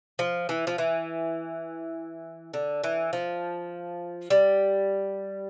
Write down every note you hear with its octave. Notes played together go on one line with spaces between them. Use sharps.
F3
E3
F3
E3
D3
E3
F3
G3